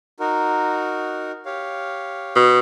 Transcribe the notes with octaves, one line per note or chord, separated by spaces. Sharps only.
D#4 F#4 A#4
G4 C#5 F5
B2